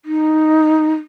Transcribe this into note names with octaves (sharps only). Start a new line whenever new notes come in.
D#4